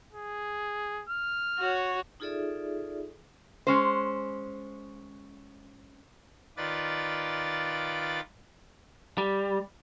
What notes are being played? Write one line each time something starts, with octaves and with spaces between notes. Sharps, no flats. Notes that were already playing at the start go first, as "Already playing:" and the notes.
G#4
F6
F#4 C#5
D#4 F4 G#4 A4 D5 E5
G#3 C#4 C5
D#3 F4 B4 D5 A6
G3